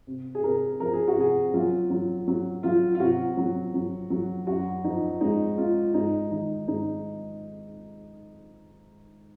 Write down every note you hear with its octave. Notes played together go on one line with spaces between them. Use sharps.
C3
G#4
C3 A#4
F3 A#4
G#4
F#4
C3 G#4
F#3 F4
F#3
F#3
F#3 F4
F4
C3 F#4
F#3
F#3
F#3
F#2 F#4
F3 D#4
G#3 D#4
G#3 F4
G#2 D#4
D#3 D#4
G#2 D#4